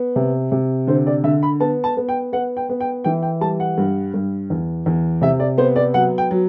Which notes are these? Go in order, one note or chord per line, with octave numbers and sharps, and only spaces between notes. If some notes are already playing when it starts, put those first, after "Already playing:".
Already playing: B3
C3
C3
D3 C5
D5
D3 E5
B5
B3 A5
A5
B3
G5
B3 F#5
G5
B3
G5
E3 G5
G5
G3 A5
F#5
G2
G2
E2
E2
C3 E5
D5
B3 C5
D5
F#3 F#5
G5
F#3